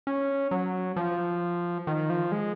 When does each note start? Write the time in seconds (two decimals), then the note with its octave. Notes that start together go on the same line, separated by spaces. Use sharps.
0.07 C#4
0.51 F#3
0.96 F3
1.87 D#3
2.10 F3
2.32 G#3